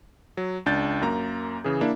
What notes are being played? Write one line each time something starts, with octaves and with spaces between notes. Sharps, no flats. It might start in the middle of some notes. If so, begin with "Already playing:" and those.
F#3
C#2 D4 G6 A6
F#2 A#3 A#5
C#3 E3 G#4
A#3 D4 E4